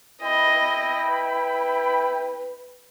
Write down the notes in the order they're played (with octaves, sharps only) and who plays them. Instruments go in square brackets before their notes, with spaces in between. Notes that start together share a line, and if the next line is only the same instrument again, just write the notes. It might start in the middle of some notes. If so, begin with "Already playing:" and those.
[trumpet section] E4 G5 B5 [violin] D#5
[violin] B4